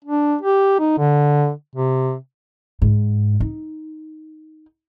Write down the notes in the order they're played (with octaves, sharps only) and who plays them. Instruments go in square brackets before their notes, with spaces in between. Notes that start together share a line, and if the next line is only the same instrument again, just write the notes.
[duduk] D4
G4
D#4
D3
C3
[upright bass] G#2
D#4